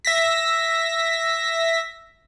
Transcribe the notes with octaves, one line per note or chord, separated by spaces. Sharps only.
E5 A#6 B6